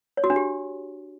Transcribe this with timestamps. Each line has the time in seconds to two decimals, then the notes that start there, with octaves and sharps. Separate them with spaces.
0.17 C#5
0.24 F#4
0.30 D4
0.36 G4